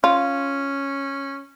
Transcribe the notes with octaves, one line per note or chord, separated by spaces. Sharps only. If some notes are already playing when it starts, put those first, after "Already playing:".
C#4 F4